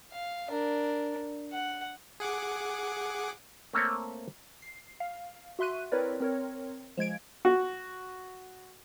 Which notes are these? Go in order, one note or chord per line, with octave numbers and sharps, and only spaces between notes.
F5
D4 A#4
F#5
G#4 F#5 D6
A3 A#3 C4 C#5
C7
F5
F#4 E5 C6 F#6 D#7
C4 E4 A#4 B4 C#5 D5
C4 A#4 C#5
F3 G#3 G#6 D7
F#4